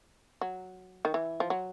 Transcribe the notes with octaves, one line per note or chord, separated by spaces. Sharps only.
F#3
D#3
E3
F3
F#3